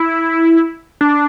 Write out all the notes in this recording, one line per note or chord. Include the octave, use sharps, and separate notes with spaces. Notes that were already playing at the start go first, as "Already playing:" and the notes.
Already playing: E4
D4